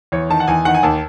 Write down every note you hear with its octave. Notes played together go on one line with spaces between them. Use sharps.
E2 C#5
D#3 A5
F#5
E2 G#5
D#3 F#5
G#5
D#2 A5